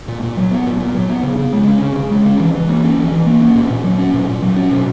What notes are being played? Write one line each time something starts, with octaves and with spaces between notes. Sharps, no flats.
A#2
A#2
F#3
B3
A#2
A#2
F#3
B3
C#3
C#3
G#3
C#4
C#3
C#3
G#3
C#4
E3
E3
A#3
C#4
E3
E3
A#3
C#4
A#2
A#2
F#3
C#4
A#2
A#2
F#3
C#4
B2